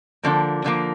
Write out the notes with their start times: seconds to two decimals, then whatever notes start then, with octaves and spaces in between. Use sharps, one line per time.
0.23 D3 F3 A#3
0.64 D3 F3 A#3